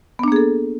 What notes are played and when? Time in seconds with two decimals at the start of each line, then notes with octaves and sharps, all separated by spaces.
0.19 B3
0.23 D4
0.28 A#3
0.32 G#4
0.36 A4